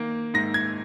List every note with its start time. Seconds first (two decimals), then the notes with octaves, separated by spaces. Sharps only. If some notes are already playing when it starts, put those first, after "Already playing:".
Already playing: D#3 A#3
0.34 G#2 A#6
0.54 G#6